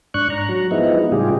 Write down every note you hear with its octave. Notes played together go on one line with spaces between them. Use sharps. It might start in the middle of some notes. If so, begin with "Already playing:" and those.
G#2 D4 C#6 F#6
A#5
F#3
F3 G#3 B3 D#4 E4
A2 C#3 G3 F4 G4 G#4